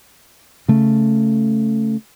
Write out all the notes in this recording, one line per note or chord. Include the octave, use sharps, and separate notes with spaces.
C#3 A3